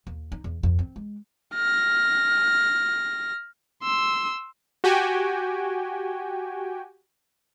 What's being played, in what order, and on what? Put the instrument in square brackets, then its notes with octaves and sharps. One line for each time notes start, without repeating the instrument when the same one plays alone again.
[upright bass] D#2
D#4
E2
F2
C4
G#3
[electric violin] F6 A#6
C6 E6
[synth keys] F#4 G4 G5 G#5